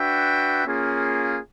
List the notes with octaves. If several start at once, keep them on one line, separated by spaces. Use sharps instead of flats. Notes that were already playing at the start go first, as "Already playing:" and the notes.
Already playing: D4 F#4 B4 E5 G5
A#3 C#4 F4 G#4